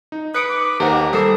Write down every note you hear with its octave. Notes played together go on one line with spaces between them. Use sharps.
D#4
B4 D#6 F#6 C#7 D7
D6
D#2 D#4 G4 A#4 C5 F#5
G3 A4 A#4 D#6 C7 E7